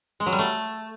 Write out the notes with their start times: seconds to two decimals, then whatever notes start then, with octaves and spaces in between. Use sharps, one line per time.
0.20 G#3
0.26 F#3
0.33 G3
0.39 A3